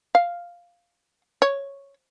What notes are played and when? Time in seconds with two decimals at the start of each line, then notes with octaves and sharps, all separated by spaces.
0.15 F5
1.42 C#5